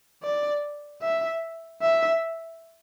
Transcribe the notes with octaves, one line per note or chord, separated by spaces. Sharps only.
D5
E5
E5